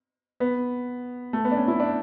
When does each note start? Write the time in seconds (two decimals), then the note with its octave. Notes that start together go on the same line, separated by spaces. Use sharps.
0.40 B3
1.33 A3
1.45 B3
1.52 D4
1.57 C#4
1.68 E4
1.80 D4